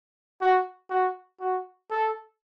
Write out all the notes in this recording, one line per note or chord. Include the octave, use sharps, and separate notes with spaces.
F#4
F#4
F#4
A4